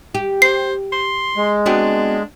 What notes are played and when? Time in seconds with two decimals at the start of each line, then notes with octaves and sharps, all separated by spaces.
0.14 G4
0.42 C5 C7
0.92 C6
1.37 G#3
1.66 B3 C4 D4 F#4